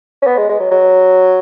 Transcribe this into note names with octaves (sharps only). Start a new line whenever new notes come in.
C#4
B3
G#3
G#3
F#3
F#3